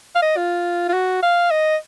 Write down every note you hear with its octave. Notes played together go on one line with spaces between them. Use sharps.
F5
D#5
F4
F4
F#4
F5
D#5